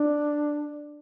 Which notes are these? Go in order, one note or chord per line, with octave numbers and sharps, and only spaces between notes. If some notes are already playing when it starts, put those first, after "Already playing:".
Already playing: D4